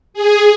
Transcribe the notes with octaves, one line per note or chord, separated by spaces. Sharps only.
G#4